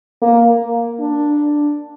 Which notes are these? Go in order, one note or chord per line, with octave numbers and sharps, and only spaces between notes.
A#3
D4